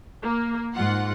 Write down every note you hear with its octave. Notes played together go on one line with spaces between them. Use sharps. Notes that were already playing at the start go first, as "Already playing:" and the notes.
A#3
G#2 F4 F#5 C6